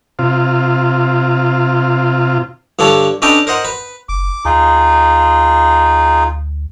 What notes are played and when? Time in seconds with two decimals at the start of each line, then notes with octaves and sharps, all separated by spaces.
0.19 C3 F4
2.79 G2 D3 D4 A4 C#5
3.22 C#4 D4 A4 B4 D#5 G5
3.47 A#4 C5 D#5 F#5
3.65 B4
4.09 F#1 D6
4.45 D2 D#4 F4 G#4